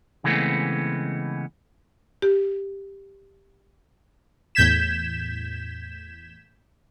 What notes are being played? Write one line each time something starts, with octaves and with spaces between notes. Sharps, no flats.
C#3 E3 G#3 A3 B3 C4
G4
E2 A2 G6 G#6 B6 E7